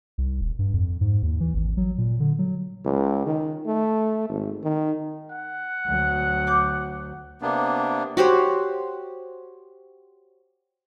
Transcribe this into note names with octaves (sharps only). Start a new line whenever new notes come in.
C2
D#1
G2
F2
G#2
D#2
E3
G#1
F#3
A#2
D3
F#3
C#2
D#3
A3
G#1
D#3
F#5
D2 F#3
D6 G6
C3 A#3 B3 D4
F#4 G4 C5 C#5